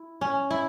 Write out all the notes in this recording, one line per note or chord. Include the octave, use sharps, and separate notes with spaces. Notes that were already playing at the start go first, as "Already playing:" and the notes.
Already playing: E4
C#4
E4